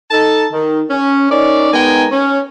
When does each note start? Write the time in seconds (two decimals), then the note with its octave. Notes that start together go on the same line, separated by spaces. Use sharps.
0.11 D#4 A4 A5
0.52 D#3
0.90 C#4
1.29 C#4 D#4 A#4 C#5 D5
1.71 G#3 B3 D#4 A#4 G5 G#5
2.10 C#4